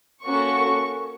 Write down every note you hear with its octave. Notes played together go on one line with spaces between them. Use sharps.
A#3 C#4 F#4 A4 C#6